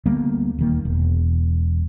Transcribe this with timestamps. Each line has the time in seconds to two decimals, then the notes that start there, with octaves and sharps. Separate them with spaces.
0.06 D2 G3 A#3 B3
0.58 D#1 D#3 A#3
0.85 E1